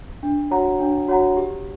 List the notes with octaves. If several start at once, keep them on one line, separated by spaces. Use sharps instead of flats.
D4
F#4 C#5 F#5 A#5
D4
F#4 C#5 F#5 A#5
G4